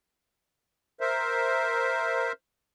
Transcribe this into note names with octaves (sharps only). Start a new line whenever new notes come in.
A#4 C5 E5